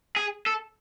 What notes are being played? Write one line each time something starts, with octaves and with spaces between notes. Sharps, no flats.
G#4
A4